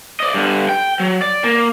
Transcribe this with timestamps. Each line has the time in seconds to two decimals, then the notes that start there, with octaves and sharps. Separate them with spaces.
0.20 D5 D#5
0.34 G2 D3
0.69 G5
1.00 F#3
1.22 D5
1.44 A#3